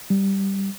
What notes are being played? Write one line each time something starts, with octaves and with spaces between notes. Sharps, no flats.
G3